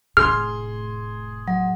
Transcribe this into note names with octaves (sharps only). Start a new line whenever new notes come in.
F1 A2 G#4 C6 F6
F#3